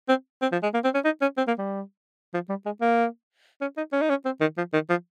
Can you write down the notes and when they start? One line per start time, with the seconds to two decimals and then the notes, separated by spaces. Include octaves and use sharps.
0.09 C4
0.42 C4
0.52 F3
0.63 G#3
0.74 A#3
0.84 C4
0.94 C#4
1.05 D#4
1.22 C#4
1.37 C4
1.47 A#3
1.59 G3
2.34 F3
2.50 G3
2.66 G#3
2.81 A#3
3.61 C#4
3.77 D#4
3.93 C#4
4.01 D#4
4.10 C#4
4.25 C4
4.41 D#3
4.57 F3
4.73 D#3
4.90 F3